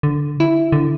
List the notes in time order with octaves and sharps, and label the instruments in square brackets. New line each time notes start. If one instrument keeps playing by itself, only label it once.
[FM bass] D3
E4
D3